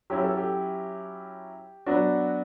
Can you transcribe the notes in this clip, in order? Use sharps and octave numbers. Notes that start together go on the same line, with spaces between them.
F#3 C#4 E4 G4
A4
G4
F#3 B3 D4 F#4